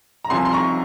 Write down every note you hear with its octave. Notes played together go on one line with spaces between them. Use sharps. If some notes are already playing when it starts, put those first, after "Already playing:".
A#5
C2 C3 F3 G#5 C6
C6
A#5 C#6